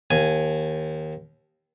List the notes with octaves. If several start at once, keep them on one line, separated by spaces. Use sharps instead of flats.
D#2 G#5